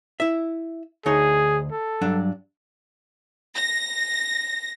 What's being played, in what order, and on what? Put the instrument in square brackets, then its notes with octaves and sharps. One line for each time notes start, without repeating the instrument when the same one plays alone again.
[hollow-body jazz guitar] E4 E5
[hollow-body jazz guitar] D2 D#4 C#5 [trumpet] G#4
[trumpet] A4
[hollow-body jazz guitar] G2 F#3 D4
[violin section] A#6